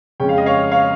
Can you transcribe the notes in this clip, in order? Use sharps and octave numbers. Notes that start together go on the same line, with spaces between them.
F2 C#3 G#3 C#4 G5
F5
D#5
C#5 F5
C#5 F5